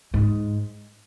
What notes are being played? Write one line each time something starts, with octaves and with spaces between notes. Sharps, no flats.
G#2